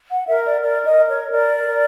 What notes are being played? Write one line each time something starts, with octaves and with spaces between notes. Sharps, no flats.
F#5
A#4 E5
D5
A#4 D5
D#5
A#4
C#5
A#4 D5
A#4